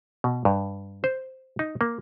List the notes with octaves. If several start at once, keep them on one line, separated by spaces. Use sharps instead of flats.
B2
G2
C5
D#4
A#3